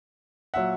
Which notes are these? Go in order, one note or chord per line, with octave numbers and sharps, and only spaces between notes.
A#2 F#3 E5 F#5